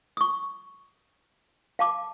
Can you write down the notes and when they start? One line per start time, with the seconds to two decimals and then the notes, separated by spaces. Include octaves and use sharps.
0.17 C#6 D#6
1.79 F5 A5 D6